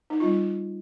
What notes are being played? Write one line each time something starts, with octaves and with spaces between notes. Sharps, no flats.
D#4
G3 C4 D#4 F4